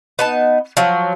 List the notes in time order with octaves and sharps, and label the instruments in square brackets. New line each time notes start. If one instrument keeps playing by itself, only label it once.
[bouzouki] B3 D#4 A5
F3 F#3